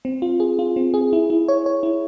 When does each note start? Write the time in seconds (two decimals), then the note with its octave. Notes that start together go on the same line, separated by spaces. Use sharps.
0.05 C4
0.22 F4
0.40 G#4
0.59 F4
0.76 C4
0.94 G#4
1.13 E4
1.30 E4
1.48 C#5
1.66 C#5
1.83 E4